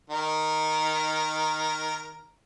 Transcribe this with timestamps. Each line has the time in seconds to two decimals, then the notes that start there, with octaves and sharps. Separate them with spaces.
0.10 D#3 A#4